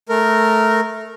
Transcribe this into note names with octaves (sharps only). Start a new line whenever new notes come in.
A3 A#4